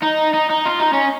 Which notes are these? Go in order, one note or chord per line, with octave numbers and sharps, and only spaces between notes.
D#4
D#4
D#4
F4
D#4
C#4